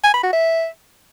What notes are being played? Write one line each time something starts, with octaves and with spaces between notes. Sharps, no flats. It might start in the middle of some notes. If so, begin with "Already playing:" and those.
G#5
B5
F#4
E5